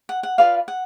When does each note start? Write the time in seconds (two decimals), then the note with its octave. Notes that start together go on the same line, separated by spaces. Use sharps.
0.09 F#5
0.23 F#5
0.38 F4 B4 D5 F5
0.68 F#5